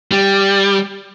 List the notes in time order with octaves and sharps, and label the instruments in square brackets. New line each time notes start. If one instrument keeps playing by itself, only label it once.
[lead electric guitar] G3